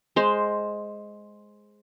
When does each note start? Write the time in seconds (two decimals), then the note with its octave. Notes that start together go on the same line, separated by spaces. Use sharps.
0.16 G#3 C5